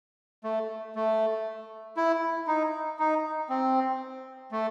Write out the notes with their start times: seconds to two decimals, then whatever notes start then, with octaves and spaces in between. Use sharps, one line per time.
0.44 A3
0.95 A3
1.97 E4
2.47 D#4
2.99 D#4
3.49 C4
4.52 A3